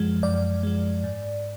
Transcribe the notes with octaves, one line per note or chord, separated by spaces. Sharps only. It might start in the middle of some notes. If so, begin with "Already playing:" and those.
Already playing: F#2 F3 G#3
F#2 D5
F3 G#3
G#2